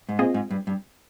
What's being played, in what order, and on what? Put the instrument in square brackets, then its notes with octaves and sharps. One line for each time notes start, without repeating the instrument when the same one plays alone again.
[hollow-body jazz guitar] G#2
[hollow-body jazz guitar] A#2 [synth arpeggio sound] C4 F4 G#4 D#5
[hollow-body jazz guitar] G#2
G2
G2